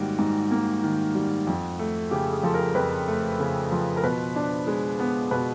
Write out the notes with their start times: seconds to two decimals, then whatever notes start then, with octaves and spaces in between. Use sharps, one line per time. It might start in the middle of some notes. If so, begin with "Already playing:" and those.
Already playing: G#2 D#3 G3 A#3 F#4 G4
0.19 G#2
0.51 A#3
0.83 D#3
1.15 G3
1.47 F2
1.79 A3
2.11 C#3 G4
2.32 G#4
2.43 F3 A4
2.54 A#4
2.75 F2 B4
3.08 A3
3.40 C#3
3.72 F3
3.97 A#4
4.04 B2 B4
4.36 D4
4.67 G#3
4.99 B3
5.31 B2 B4